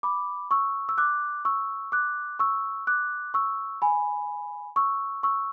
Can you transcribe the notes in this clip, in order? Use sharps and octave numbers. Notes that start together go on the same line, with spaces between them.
B5 D6
C#6 E6
E6
D6 F#6
C#6 E6
D6 F#6
C#6 E6
D6 F#6
C#6 E6
G#5 B5
C#6 E6
C#6 E6